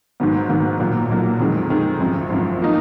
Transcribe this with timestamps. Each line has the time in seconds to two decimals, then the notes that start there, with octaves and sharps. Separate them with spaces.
0.20 G#2 D#3 F#3 B3
0.49 G#2 D#3 F#3 B3
0.79 B1 A#2 F#3 A#3
1.10 B1 A#2 F#3 A#3
1.39 F2 D#3 G#3
1.70 F2 D#3 G#3
2.00 G#1 F#2 F3
2.30 G#1 F#2 F3
2.61 F3 A#3 D#4